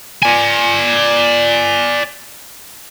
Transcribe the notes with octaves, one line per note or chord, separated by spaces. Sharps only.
D5 G#5